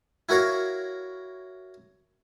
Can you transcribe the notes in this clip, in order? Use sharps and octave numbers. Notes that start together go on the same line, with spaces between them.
E4 F#4 A#4 C#5 F5